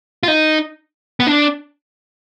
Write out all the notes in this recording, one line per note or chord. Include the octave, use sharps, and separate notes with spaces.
F4
D#4
B3
D4